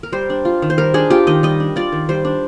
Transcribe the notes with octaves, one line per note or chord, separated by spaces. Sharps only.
A#4
G3 C5
D4
F4
D#3
C5
G3 A#4
D4 G#4
F4 G4
D#3 D#5
G3 D#5
D4
F4 D5
D#3
G3 C5
D4